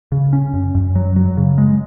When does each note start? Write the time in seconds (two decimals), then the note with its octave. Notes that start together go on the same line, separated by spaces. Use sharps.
0.12 C#3
0.33 C#4
0.53 F#2
0.75 F#2
0.95 F#3
1.16 F#3
1.37 C#3
1.58 G#3